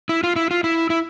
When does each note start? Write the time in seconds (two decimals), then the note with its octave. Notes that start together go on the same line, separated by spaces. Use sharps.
0.09 E4
0.24 F4
0.36 E4
0.51 F4
0.64 E4
0.90 E4